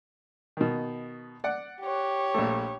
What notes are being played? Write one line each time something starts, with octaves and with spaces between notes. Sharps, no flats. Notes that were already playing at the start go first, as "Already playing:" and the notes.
B2 D#3
D5 F#5
G4 C#5
A#1 A3